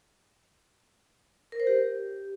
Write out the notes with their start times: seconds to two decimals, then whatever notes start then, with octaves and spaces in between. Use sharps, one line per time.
1.52 A#4
1.60 C5
1.67 G4